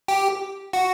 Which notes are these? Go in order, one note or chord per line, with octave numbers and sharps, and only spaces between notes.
G4
F#4